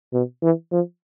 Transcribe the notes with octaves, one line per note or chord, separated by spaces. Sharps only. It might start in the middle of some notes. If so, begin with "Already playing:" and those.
B2
E3
F3